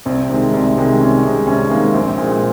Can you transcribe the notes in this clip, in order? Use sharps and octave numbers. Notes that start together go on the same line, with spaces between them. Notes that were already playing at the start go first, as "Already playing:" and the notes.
C2 C4
C3 D#3 G#3
C2
C3 D#3 G#3
C2 C#4
C3 D#3 G#3
C2 C#4
C3 D#3 G#3 A#3
A#1 C4
A#2 G#3